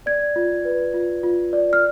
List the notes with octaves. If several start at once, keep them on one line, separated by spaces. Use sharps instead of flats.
D5 G#6
F4
B4
F4
F4
D5
F6